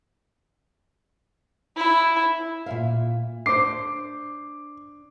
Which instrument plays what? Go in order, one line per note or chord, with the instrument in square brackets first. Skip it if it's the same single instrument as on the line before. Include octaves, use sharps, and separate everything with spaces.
[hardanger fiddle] E4
[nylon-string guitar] A#2 E5 F5
[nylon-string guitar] D4 C5 [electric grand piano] D6 C7